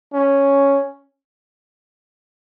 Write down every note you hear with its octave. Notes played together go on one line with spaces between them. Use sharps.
C#4